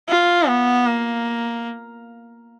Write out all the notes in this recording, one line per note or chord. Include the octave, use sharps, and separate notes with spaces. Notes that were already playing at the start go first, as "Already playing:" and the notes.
F4
B3
A#3